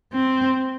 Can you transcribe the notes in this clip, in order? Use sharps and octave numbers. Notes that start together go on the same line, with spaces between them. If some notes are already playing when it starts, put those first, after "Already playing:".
C4